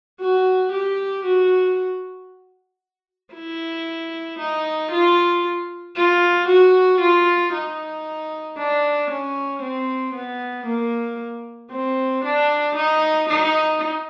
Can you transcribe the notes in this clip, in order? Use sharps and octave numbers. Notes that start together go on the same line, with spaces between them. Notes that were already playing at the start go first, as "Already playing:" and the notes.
F#4
G4
F#4
E4
D#4
F4
F4
F#4
F4
D#4
D4
C#4
C4
B3
A#3
C4
D4
D#4
D#4